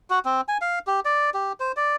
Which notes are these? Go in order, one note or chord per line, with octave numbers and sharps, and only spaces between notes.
F#4
C4
G#5
F5
G4
D5
G4
C5
D5